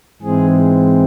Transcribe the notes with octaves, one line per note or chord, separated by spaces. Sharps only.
G#2 E3 G#3 C4 G#4